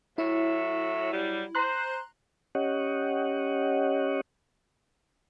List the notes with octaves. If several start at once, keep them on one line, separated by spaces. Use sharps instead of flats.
A2 F#3 E4 E5
F#3 G3
C5 A#5 C6 F#6
C#4 G4 C#5 D#5 F#5